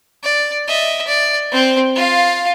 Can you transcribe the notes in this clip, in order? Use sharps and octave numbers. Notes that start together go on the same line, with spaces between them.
D5
D#5 E5
D5
C4 C5
F4 F5